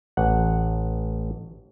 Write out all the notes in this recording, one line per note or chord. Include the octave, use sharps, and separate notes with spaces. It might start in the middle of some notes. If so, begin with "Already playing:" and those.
A1 F#5